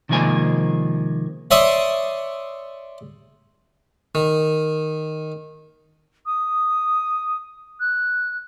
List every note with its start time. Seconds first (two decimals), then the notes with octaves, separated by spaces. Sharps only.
0.09 C3 D#3 F3 G#3 A#3 G#5
1.51 C#5 D5 E5 C6 C#6 D#6
4.15 D#3
6.26 D#6
7.80 F#6